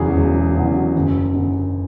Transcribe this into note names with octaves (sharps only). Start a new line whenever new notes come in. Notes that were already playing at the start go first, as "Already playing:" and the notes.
Already playing: E1 E2 C#3 F#3 G#4
E1
E2 C#3 F#3
F#1
F#2 D3